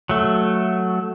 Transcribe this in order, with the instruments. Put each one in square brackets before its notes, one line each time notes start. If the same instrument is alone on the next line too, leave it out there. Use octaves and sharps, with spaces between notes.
[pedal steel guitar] F#3 A3